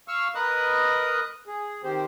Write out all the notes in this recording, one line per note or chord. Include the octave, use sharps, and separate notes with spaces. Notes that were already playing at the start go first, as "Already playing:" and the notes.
F5 C#6 E6 F6
A#4 B4 D#5 D#6 F#6
G#4
D#3 C4 G4 C5